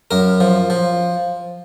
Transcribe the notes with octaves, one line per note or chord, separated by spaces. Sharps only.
F#2 A#4
F3
F3